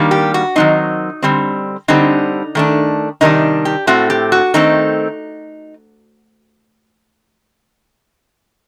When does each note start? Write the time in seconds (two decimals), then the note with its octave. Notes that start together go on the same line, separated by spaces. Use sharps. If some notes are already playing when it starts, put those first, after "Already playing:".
Already playing: D#3 G3 A#3 D4
0.11 G4
0.34 F#4
0.56 D#3 F#3 C4 D#4
1.23 D3 G3 C4
1.88 D3 G3 C4 D#4
2.55 D#3 A3 D4
3.21 C3 D#3 G3 D4 D#4
3.65 G4
3.87 A2 A3 C4 F#4
4.10 G4
4.32 F#4
4.54 D#3 A3 C4 D#4